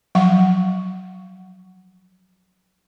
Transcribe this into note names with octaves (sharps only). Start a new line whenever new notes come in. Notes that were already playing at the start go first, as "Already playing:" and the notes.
F3 F#3 F#5 C#6